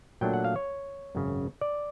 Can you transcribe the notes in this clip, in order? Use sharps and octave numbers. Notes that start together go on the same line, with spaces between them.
A#2 F#3 A3 D4 G5
F#5
F5
C#5
G#1 F#2 C#3
D5